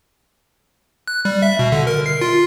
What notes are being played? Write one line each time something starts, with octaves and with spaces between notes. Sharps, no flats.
F#6
G3
E5
B2
D3
A#4
C7
F4